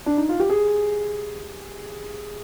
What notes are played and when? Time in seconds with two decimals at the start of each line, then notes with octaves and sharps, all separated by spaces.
0.06 D4
0.17 D#4
0.29 F4
0.40 G4
0.49 G#4